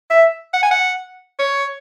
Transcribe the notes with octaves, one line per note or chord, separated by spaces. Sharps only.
E5
F#5
G#5
F#5
C#5